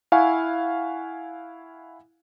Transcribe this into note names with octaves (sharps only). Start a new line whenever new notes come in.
E4 F5 F#5 G#5 C#6